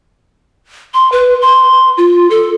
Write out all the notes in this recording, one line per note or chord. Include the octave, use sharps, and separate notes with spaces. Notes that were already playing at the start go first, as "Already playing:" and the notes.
C6
B4
C6
F4
A4